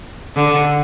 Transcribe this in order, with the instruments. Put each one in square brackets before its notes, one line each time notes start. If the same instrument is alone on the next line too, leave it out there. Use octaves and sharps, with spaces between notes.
[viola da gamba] D3